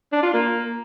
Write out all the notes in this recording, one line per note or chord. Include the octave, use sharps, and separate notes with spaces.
D4
F4
A#3